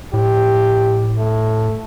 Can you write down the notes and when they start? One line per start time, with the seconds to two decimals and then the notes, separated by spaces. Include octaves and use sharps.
0.14 A2 G4
1.18 A3